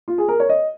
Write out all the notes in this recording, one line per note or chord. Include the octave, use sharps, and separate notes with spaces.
F4
G#4
A#4
C#5
D#5